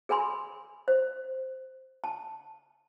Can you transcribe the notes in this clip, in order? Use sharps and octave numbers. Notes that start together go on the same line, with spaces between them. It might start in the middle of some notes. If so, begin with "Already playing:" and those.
G#4 A#4 G#5 B5 C6
C5
A5